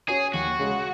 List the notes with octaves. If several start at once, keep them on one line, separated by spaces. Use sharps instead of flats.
C#4 F#4 G#4 C#5
D#2 F#4
C#3 G#3